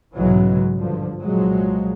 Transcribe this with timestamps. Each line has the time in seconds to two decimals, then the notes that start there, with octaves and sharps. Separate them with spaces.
0.16 B1 G#2 C#3 E3 F#3 G#3
0.79 G2 D3 F3
1.23 C2 A#2 F3 F#3 G#3